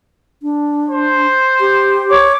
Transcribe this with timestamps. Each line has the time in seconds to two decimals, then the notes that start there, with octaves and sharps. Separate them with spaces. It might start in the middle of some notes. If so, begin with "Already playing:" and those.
0.43 D4
0.90 C5
1.60 G4
2.09 C#5 D6